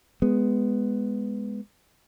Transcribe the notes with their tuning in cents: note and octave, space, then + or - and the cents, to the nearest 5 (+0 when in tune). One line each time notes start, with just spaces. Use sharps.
G#3 +0 B3 +5